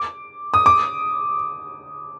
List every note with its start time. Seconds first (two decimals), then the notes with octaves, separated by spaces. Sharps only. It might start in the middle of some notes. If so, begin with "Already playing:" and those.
Already playing: D6
0.54 D#6
0.66 D6